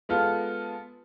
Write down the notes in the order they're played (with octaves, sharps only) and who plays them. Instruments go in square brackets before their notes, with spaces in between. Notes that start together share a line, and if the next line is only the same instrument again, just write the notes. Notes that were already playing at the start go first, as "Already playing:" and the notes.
[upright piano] G#3 B3 F4 A4